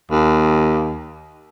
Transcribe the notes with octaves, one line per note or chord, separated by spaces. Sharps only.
D#2